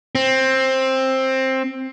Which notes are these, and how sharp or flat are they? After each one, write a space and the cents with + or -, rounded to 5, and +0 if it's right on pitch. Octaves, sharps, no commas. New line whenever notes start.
C4 +15